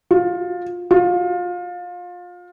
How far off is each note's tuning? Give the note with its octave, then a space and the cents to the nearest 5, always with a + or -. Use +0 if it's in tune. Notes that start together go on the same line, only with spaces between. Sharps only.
F4 +20
F4 +25